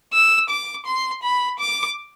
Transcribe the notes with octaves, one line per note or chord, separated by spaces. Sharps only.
E6
D6
C6
B5
D6